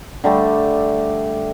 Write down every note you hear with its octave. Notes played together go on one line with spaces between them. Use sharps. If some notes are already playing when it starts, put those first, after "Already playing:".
D3 G3 A3